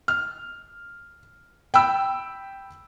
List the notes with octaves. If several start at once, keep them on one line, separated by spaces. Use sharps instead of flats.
F6
G5 B5 E6